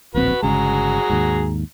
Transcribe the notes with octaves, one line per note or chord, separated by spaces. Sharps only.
D1 A#1 C4 F#4 B4
G1 C#3 G#3 F#4 G#4 A#5
D#2 G#2